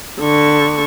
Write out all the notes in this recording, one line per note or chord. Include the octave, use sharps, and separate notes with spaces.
D3 C#6